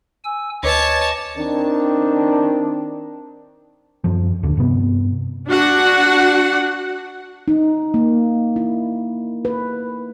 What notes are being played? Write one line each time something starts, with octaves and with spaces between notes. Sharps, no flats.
G#5 E6
D2 B4 C#5 D#5 A5 C#6 D6
D#3 C4 D4
F#2 F3
D1 D#2 D3
G2 C3 B3
D4 F#4 F#5
D#4
A#3
E4
B4